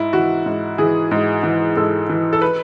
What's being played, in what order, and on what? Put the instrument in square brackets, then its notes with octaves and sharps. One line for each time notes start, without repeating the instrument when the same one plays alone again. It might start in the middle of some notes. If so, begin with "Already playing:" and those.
Already playing: [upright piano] G#2 E4
E3 F#4
G#2
E3 G#4
G#2
E3
G#2 A4
E3
A4
B4